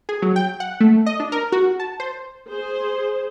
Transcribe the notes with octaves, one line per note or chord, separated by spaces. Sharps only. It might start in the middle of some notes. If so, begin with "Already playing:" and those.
G#4
F#3
G5
F#5
A3
D#5
D4
A#4
F#4
A5
C5
G#4 C5